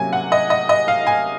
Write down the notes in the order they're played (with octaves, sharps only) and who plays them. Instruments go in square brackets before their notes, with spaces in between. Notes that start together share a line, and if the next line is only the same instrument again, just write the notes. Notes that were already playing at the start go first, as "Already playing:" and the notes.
Already playing: [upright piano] C3 F#3 A#3 C#4 G#5
F#5
D#5
D#5
D#5
F5
G#5